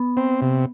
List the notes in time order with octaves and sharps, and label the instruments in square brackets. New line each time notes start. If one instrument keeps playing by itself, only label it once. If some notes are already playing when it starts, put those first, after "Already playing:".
Already playing: [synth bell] B3
[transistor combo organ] C4
C3